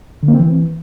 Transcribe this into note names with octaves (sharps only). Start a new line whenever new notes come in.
D3
A#3
C4
E3